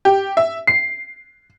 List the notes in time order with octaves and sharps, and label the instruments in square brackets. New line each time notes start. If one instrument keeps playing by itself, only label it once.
[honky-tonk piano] G4
E5
C7